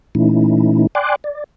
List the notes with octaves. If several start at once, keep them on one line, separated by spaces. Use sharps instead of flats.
A#2 E3 A3 C#4 D#4 E4
D5 G5 G#5 C6 D6 F#6
D5